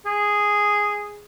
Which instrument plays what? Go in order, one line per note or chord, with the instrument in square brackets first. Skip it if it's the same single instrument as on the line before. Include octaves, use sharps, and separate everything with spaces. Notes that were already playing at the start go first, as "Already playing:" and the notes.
[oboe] G#4